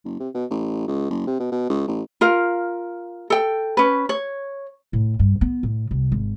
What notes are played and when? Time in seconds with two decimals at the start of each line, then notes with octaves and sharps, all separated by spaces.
0.05 F#1
0.20 C3
0.35 B2
0.50 A1
0.88 C#2
1.10 F#1
1.27 C3
1.40 B2
1.52 B2
1.70 C#2
1.87 A1
2.21 F4 A#4 F5
3.30 A4 G5
3.77 C#4 B4
4.09 C#5
4.93 A2
5.19 G2
5.41 B3
5.63 A2
5.91 C2
6.12 G#1